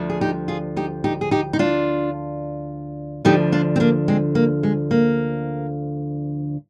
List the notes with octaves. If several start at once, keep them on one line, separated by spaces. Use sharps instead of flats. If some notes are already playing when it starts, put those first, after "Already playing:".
Already playing: D2 D3 F3
G#4
D#4 G4
F4 G#4
D#4 G4
D#4 G4
G#4
D#4 G4
D#4
D4 F4
D2 D3 F3 D#4 G4
D4 F4
C4
A#3 D4
G#3 C4
A#3
G#3
A#3